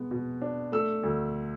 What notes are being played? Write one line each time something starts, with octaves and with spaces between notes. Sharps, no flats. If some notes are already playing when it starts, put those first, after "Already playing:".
Already playing: B2 G#3 B3
B2
D4
A3 E6
D2